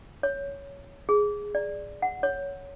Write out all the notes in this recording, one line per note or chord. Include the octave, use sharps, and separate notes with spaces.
C#5
G#4
D5
F#5
C#5